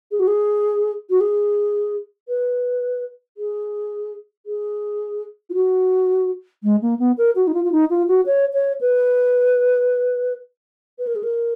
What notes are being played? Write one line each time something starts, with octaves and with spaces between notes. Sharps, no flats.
G#4
F#4
G#4
F#4
G#4
B4
G#4
G#4
F4
F#4
G#3
A#3
B3
A#4
F#4
D#4
F4
F4
D#4
F4
F#4
C#5
C#5
B4
B4
A#4
G#4
A#4